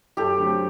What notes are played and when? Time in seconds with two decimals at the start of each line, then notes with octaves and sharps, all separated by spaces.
0.17 F#2 G4 A4
0.37 D3 F#3 A3 C4